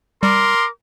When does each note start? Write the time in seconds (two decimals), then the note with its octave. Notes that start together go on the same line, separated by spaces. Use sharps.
0.23 G3 A#4 C6 D6